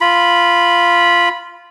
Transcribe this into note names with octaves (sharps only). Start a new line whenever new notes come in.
F4 B5